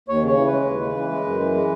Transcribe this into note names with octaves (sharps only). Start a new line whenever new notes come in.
D#2 C#5
C#3 C#5
E3
B4
G#3
D#2
C#3
E3
G#3
F#2
E3
G#3